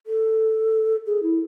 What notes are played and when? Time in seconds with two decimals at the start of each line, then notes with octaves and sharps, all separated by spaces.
0.07 A4
1.06 G#4
1.23 E4